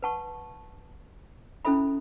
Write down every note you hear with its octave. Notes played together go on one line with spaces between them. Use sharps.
B4 F#5 A5 C#6
C#4 E4 A4 E5 B5